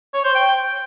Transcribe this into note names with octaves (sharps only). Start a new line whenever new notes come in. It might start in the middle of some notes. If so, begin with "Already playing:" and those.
C#5
C5
G5